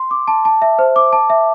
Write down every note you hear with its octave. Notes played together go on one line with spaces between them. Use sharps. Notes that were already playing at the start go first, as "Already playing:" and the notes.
Already playing: C6
D6
A5
A5
E5
C5
D6
A5
E5